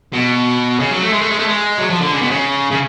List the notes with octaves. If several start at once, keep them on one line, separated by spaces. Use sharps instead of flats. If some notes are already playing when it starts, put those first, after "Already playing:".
B2
C#3
F#3
A3
G#3
A3
G#3
A3
G#3
F#3
F3
D3
C#3
B2
C#3
C#3